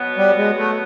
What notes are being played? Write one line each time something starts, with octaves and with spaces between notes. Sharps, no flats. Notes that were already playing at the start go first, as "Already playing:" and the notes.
Already playing: B2 F#3 B3
G3
G#3
A3